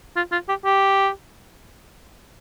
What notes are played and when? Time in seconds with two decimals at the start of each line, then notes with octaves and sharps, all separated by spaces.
0.17 F4
0.32 F4
0.49 G4
0.65 G4